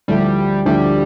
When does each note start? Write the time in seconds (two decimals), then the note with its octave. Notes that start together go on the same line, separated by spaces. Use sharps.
0.08 D2 D3 F3 G3 A3 E4
0.65 D2 D3 F3 G3 A3 E4